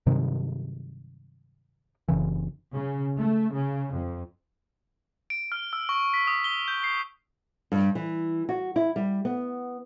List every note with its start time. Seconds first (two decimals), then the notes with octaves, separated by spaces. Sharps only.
0.06 G2 C3 D#3 F#3
2.08 F#1 C#3 E3
2.73 C#3
3.17 A3
3.52 C#3
3.94 F2
5.30 D7
5.52 F6
5.73 E6
5.89 C#6
6.14 B6
6.27 D#6
6.44 G7
6.68 G6
6.84 C7
7.72 G2
7.95 E3
8.49 F#4
8.76 E4
8.96 G3
9.25 B3